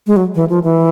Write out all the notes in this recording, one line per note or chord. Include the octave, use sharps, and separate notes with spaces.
G#3
F#3
E3
F3
E3